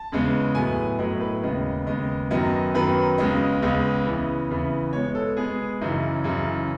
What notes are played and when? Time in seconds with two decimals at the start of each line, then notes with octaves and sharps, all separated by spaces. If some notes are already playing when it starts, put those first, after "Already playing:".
Already playing: A5
0.12 E2 C#3 G#3 B3
0.55 A2 F#3 B3 G#5
0.99 A2 F#3 B3 D#5
1.20 B4
1.43 D#2 C#3 G#3 B3 D#5
1.86 D#2 C#3 G#3 B3 D#5
2.30 F#2 D#3 F#3 B3 D#5
2.74 F#2 D#3 F#3 B3 B4
3.18 C#2 C#3 G#3 B3 D#5
3.62 C#2 C#3 G#3 B3
4.05 E2 C#3 E3 B3
4.49 E2 C#3 E3 B3
4.93 B2 G#3 B3 C#5
5.15 A4
5.37 B2 G#3 B3 G#4
5.81 F#2 C#3 E3 D#4
6.24 F#2 C#3 E3